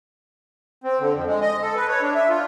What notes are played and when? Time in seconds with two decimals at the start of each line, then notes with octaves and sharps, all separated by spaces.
0.84 C4
1.00 D3
1.13 F2
1.27 G#3
1.41 D#5
1.62 A4
1.76 B4
1.89 C#5
2.02 D4
2.15 E5
2.29 F4